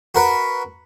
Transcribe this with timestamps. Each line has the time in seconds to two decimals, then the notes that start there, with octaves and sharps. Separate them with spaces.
0.15 F#4 A#4 B4